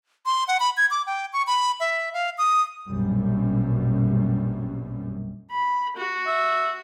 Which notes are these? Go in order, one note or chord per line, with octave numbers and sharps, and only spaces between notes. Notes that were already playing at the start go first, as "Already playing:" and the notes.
C6
F#5
B5
G#6
D6
G5
C#6
B5
E5
F5
D#6
A#1 F#2 B2 G3
B5
F#4
E5